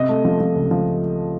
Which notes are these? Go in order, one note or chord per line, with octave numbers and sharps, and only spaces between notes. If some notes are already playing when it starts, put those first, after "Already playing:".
Already playing: C3 D#5
A3
F3
F3
C#2
F3